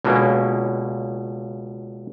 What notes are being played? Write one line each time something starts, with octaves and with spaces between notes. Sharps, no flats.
C#2 B2 D3 A#3 C#4